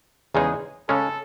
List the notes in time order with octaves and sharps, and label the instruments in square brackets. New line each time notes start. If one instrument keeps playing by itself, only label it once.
[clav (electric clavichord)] E2 C#3 G#3 D#4 [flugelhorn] G#4
[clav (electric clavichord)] C#3 G#3 C#4 [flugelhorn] A4